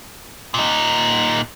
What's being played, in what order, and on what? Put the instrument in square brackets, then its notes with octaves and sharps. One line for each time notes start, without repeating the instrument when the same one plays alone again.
[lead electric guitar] A#2 D#4